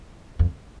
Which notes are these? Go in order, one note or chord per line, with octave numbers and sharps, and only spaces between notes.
F2